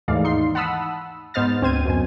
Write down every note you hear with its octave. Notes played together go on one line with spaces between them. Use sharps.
D#2 G#2 E3 A3 D5 F5
D#4 C6 C7
F#5 A5 B5 D#6 E6
G#2 B3 C5 D#5 F6 A6
D2 C4 C5 G#6 D#7
F#2 B2 G#5